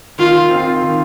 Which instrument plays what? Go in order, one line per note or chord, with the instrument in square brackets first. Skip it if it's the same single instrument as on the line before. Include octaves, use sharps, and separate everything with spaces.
[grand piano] D#3 [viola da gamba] F4
[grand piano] C4 F4
D#3